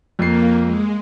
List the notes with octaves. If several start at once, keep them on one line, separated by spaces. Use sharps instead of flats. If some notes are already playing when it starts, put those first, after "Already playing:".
F2 A#3 C7
G#3